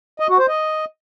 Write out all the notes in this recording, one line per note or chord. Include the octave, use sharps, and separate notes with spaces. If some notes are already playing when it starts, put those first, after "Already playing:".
D#5
F#4
C5
D#5